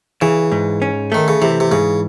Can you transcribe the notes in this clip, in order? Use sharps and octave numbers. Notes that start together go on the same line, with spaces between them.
C#3 E3
G#2
C#4
D#3 A3
C#3
C3 E3
C3
G#2 C#3